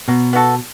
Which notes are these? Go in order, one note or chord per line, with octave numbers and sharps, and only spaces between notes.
B2 F#3
B3 F#4 A4